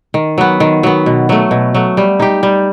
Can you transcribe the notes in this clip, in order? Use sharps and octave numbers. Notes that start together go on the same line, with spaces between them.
D#3
F#3 B3
D#3
F#3 B3
B2
F#3 A3
B2
F#3 A3
G3
D#4 G4
G3